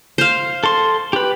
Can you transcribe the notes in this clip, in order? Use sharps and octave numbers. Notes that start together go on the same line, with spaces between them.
C5 F5
A4 C6
G4 B4